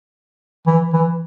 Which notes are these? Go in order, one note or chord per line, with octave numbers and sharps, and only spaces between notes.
E3
E3